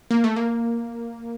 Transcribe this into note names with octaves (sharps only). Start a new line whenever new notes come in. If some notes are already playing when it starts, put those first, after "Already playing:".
A#3
A3
A#3